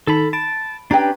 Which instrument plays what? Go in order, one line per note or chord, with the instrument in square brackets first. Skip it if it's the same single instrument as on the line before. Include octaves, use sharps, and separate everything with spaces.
[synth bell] D#3 D#4 A5 [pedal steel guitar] A4 B5
[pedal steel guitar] A5 [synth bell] B5 D7
[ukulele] C#4 G5 [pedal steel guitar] D4 G4 B4 [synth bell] A#5